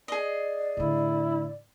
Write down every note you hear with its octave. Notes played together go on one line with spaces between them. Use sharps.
G#4 D5 D#5
A2 D3 E4